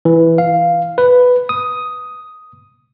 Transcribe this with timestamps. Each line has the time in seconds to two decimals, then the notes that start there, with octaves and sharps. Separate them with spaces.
0.05 E3
0.38 F5
0.98 B4
1.49 D#6